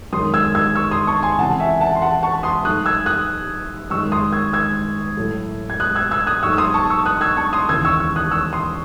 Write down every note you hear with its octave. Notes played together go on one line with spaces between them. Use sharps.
F#2 D#3 G#3 C6 D#6
E6 G#6
E6 G#6
C#6 E6
C6 D#6
A5 C#6
G#5 C6
C#2 C3 E3 F#5 A5
E5 G#5
F#5 A5
C6
F#5 A5
A5 C#6
C6 D#6
G#2 F#3 A3 D#6 F#6
E6 G#6
D#6 F#6
F#2 D#3 G#3 C#6 E6
C6 D#6
E6 G#6
E6 G#6
A2 F#3 A3
G#6
D#6 F#6
E6 G#6
E6 G#6
D#6 F#6
G#2 F#3 A3 C#6 E6
E6
C6 D#6
A5 C#6
C#6 E6
D#6 F#6
E6 G#6
A5 C#6
C6 D#6
D#2 C#3 E3 E6 G#6
C#6 E6
C#6 E6
D#6 F#6
C#6 E6
C6 D#6